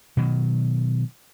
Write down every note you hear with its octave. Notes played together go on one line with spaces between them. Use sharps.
B2 D#3 F#3